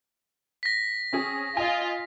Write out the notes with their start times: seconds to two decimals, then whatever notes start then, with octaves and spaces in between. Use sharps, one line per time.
0.63 A#6 B6
1.13 C4 C#4 G#4
1.57 F4 D#5 G#5